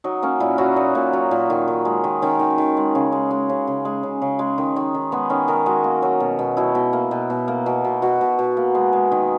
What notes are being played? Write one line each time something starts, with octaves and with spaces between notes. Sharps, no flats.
F#3 D#4
A#3 C#4
A#2 E4
F#3 F#4
A#2 D#4
A#2
F#3
A#2
D#3
D#3
G#3
D#3
D#3 C#4
D#3
D#3
G#3
C#3
G#3
G#3
C#3
C#3
G#3
C#3
C#3
G#3
D#3
D#3
D#3
G#3 B3
D#3 C#4
D#3 A#4
G#3 F#4
A#3
F#3
B2
B2
B2 E4
B2
A#3
B2
B2
A#3
B2
B2
B2 F#4
B2
B2
A#3
G#3
G#3
D#3